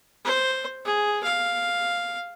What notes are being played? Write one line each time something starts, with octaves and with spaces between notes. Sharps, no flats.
C5
G#4
F5